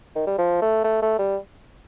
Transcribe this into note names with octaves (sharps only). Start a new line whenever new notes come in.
D#3
G3
F3
A3
A3
A3
G3